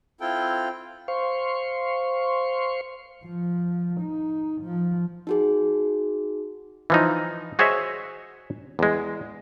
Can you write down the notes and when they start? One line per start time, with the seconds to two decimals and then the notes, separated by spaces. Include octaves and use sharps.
0.21 C4 E4 F4 A4 G5
1.08 C5 F5 C6 C#6
3.24 F3
4.01 D#4
4.62 F3
5.27 D#4 F#4 G#4
6.90 E3 F3 D#4
7.59 F#4 G#4 C5 C#5 D#5 E5
8.79 E2 G#3